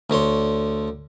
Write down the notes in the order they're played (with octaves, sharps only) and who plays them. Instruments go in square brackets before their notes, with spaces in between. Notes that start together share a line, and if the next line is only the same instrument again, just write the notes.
[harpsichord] D2 D3 C#5 C6